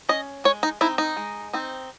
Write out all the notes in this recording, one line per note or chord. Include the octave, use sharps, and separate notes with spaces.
C#4 D#5
G#3 C#5
D#4
C4 D#4 E4
D#4
G#3
C4 D#4